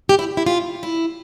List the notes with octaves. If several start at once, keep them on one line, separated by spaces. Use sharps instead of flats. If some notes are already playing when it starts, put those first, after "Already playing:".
G4
E4
E4
F4
E4